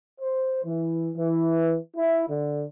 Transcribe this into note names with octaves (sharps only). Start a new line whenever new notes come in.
C5
E3
E3
E4
D3